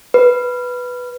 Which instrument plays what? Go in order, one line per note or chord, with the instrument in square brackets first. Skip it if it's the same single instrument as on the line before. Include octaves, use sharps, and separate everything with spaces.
[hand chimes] B4